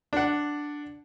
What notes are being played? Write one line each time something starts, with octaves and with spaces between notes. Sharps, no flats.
D4 F#5